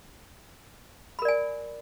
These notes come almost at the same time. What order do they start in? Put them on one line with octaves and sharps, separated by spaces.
B5 A#4 D5 G#5